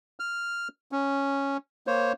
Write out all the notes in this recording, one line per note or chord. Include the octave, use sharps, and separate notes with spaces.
F6
C#4
A#3 C5 C#5